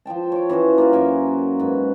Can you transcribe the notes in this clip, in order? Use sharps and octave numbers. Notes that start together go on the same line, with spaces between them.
F3 C5 G5 A5
C#5 D6
E3 C#4 F#4 C5
A#3 F4 F#4
F#2 A#4 E5 G#5
G#2 B4